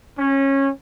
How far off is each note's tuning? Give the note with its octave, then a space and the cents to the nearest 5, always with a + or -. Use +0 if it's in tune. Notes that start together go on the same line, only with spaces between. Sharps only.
C#4 -20